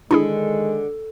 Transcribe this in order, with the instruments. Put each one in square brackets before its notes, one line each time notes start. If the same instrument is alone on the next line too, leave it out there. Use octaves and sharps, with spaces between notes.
[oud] D3 [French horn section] D#3 G#3 [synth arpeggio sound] D4 E4 G#4